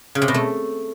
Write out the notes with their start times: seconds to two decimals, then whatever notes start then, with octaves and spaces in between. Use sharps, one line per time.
0.15 C#3
0.22 C3
0.28 B2
0.34 A3